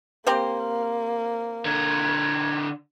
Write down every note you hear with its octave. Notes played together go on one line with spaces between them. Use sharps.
A#3 C4 G4 C5
D3 A#4 G#6